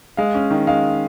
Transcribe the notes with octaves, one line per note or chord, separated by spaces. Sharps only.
G#3 F5
C#4
D#3
G#3 F5